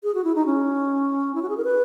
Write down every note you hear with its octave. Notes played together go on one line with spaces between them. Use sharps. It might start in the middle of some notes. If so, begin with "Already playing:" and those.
G#4
F#4
E4
D#4
C#4
E4
F#4
G#4
A#4
B4